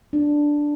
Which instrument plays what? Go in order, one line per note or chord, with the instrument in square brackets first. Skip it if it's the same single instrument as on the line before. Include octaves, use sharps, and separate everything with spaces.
[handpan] D4